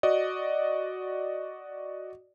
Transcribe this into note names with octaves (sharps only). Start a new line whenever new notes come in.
F#4 D5 D#5